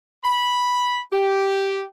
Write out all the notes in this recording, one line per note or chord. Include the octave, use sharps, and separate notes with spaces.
B5
G4